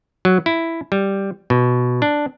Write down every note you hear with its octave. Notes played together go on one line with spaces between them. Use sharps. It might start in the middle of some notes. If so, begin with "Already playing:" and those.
F#3
E4
G3
B2
D4